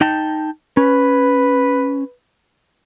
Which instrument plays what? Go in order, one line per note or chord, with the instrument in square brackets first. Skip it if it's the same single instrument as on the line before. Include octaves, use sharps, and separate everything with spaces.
[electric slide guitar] D#4 G5 A5
[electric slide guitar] C#4 [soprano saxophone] B4